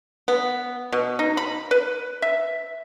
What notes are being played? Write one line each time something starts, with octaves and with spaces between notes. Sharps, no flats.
B3
B2
D#4
B5
B4
E5